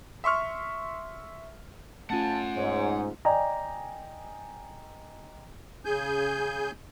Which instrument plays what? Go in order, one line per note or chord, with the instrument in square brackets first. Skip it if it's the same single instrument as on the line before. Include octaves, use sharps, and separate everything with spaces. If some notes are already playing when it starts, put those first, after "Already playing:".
[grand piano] E5 C6 C#6 F6
[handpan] A3 C#4 F4 [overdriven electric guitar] F#5 G#5 [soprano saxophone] A5
[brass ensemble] G#2 [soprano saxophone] C#5
[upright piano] D5 D#5 G5 G#5 A#5
[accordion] C#3 G#4 G#5 G6